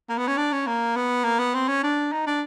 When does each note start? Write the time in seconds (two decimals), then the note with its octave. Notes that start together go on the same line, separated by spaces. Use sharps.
0.09 A#3
0.18 B3
0.28 C#4
0.37 D4
0.53 C#4
0.67 A#3
0.97 B3
1.24 A#3
1.39 B3
1.55 C4
1.68 C#4
1.83 D4
2.12 D#4
2.27 D4